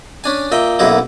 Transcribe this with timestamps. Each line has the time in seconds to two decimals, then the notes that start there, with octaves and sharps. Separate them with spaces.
0.24 C#4 D4 G#5
0.52 A#2 D#5 E5 G5
0.79 B1 F#2 A#3 D#4 E4